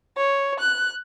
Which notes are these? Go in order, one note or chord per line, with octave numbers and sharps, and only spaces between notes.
C#5
F#6